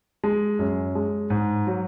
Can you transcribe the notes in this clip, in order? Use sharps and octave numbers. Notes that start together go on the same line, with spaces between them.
G#3
F#2
G#3
G#2
F#3